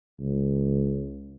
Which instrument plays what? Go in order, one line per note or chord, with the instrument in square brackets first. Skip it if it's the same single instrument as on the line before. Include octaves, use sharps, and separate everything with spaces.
[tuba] C#2